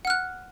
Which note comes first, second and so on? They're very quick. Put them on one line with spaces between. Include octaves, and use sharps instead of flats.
F#5 F6 F#6